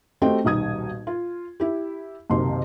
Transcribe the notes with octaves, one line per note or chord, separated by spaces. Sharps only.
A3 C4 F#4 G4 D#5 G5
D#1 B1 D#4 D#6 G#6
F4
E4 G4
F#1 B1 C3 D#3 C6